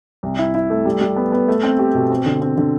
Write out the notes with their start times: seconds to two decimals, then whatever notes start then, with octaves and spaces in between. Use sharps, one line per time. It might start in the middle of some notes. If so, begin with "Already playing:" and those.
0.23 C2
0.39 E4
0.54 E4
0.70 A3
0.85 G3
1.01 G3
1.16 B3
1.32 B3
1.48 A3
1.63 C4
1.79 G4
1.95 B2
2.10 C4
2.26 D3
2.42 C4
2.58 D3